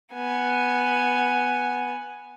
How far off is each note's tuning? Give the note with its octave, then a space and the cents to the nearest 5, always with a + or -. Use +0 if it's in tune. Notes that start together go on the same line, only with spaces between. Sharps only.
B3 +0 G#5 +0